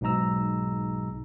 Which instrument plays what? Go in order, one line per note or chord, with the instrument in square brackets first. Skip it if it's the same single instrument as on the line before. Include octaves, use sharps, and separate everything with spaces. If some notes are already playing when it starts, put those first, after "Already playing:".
[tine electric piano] B1 G#2 B2 D#4 A#5 E6